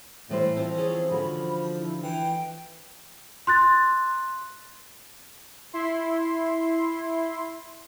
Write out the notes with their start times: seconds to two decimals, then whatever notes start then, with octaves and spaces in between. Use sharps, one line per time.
0.31 A2 E3 G3 C5
0.57 F3 C4 F4
0.78 C#4 F4 G#4 C#5
1.11 D3 F3 F#4 B5
1.77 E4
2.03 E3 G5
3.47 C6 F#6 A6
5.73 E4 C6